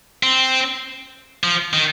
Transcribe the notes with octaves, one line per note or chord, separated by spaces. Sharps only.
C4
F3
D#3